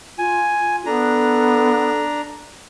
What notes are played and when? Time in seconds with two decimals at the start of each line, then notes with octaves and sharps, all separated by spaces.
0.18 F4 G#5
0.86 B3 D4 A4 A#5